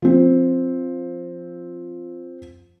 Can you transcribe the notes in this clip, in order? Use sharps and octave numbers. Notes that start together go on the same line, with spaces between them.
F3 C4